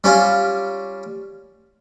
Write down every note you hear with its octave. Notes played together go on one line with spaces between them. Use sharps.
G3 C#4 F4